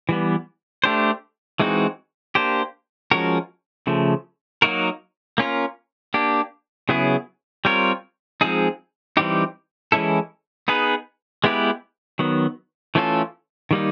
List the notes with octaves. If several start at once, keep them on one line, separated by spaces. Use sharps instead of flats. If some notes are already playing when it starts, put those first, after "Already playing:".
E3 G3 B3
A3 D4 G4 C5
E3 G#3 C4 D#4 F#4
A#3 D4 G4 C5
F3 G#3 C#4 F#4 A#4
C#3 F3 A3
F#3 A#3 D#4 F#4 A#4
A#3 C#4 F4 A#4
A#3 D4 G4
C#3 F#3 B3 E4 G#4
G3 C4 F4 A#4 C#5
F3 G#3 C4 D#4 G#4
E3 G3 C4 D#4 G4
E3 G#3 C#4 E4 A4
B3 D#4 G#4 B4
G#3 B3 E4 G4 B4
D#3 F#3 B3
E3 A3 C#4 F4 A4
D#3 G3 A#3 D#4